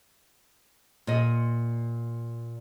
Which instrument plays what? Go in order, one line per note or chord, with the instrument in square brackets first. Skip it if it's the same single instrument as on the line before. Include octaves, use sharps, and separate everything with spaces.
[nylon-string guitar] A#2 D#5